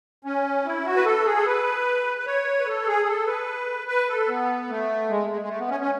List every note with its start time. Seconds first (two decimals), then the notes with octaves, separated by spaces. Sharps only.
0.25 C#4
0.65 E4
0.84 F#4
0.96 B4
1.05 A4
1.25 G#4
1.37 A4
1.46 B4
2.18 B4
2.26 C#5
2.60 B4
2.67 A4
2.87 G#4
3.07 A4
3.27 B4
3.87 B4
4.08 A4
4.28 B3
4.69 A3
5.10 G#3
5.29 G#3
5.42 G#3
5.49 A3
5.59 B3
5.70 C#4
5.80 C#4